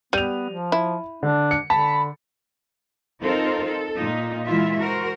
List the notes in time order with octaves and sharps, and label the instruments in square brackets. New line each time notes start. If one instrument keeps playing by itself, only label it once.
[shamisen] G3 [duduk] B3 [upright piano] D#7 F7
[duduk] F3
[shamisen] E4
[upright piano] D3 [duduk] D4
[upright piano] C#7
[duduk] D3 [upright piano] A5 [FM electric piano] B5
[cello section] C4 D#4 F4 A4 A#4 C5
A4
A#2 D#4 F4
E3 G#3 E4 F4 E5
F#4 A#4 C5